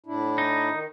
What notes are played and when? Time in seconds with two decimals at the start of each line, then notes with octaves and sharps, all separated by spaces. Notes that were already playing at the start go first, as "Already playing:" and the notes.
0.06 A2 D4 E4
0.38 D#4
0.70 D#3